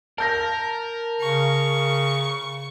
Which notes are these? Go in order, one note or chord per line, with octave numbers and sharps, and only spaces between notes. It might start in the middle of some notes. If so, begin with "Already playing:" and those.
A#4 A5 G6 A#6
C#3 C#6